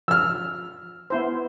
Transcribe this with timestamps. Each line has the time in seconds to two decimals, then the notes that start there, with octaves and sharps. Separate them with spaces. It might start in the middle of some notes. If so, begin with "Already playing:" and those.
0.08 F3 E6 F6
1.10 B3 E4 C5